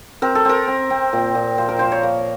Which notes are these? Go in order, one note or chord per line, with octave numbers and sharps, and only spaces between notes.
C4 A#4
A4
C4 A#4
C4
C4
A#2
A#2
F3 C5
A#4
F3 C5
C#5
A#3